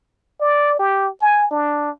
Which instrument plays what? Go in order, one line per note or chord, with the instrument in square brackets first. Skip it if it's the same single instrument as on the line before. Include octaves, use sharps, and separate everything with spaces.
[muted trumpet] D5
G4
G#5
D4